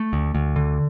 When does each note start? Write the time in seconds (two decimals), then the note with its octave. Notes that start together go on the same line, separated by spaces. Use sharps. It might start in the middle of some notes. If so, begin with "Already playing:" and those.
Already playing: A3
0.13 D2
0.35 D2
0.56 D3